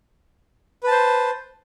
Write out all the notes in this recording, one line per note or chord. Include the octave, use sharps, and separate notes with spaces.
B4 C5 A5